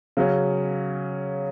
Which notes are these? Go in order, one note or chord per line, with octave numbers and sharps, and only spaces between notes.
C#3 F#3 C#4